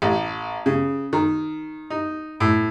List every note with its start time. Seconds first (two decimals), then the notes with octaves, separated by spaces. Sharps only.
0.02 A1
0.66 C#3
1.13 D#3
1.90 D#4
2.40 A2